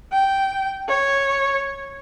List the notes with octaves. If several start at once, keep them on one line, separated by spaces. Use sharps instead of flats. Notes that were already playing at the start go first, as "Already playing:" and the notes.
G5
C#5